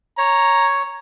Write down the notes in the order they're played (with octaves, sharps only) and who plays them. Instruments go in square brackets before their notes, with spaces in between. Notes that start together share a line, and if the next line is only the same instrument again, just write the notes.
[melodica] C#5 [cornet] A#5